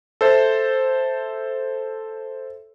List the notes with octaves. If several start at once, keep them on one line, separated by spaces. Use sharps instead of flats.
A4 C5 E5